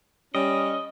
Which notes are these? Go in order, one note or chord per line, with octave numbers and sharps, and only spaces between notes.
G3 C#4 D#5